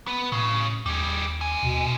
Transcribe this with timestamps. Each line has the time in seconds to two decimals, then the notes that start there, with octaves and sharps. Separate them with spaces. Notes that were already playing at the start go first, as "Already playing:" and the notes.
0.07 B3
0.32 B1 A2 C#3
0.86 D#2 G3 G#4 D7
1.41 D3 G#5
1.63 D#2 B2